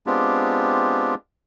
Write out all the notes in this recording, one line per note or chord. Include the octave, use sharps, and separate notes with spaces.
G#3 B3 C4 D4 F4 G4